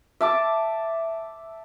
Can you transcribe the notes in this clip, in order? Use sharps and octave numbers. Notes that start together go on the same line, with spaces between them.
E5 A5 D6